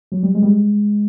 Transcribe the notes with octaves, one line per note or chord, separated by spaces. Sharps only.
F#3
G3
G#3
G3
G#3